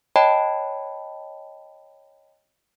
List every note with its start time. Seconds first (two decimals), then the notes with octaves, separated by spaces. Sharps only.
0.16 C#5 D#5 G5 A5 B5